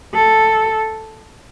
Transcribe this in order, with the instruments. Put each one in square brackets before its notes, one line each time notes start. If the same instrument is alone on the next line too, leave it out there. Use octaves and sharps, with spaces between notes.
[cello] A4